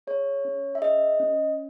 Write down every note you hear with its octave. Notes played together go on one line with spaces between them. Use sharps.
G#4 C#5
C#4
E5
G#4 D#5
C#4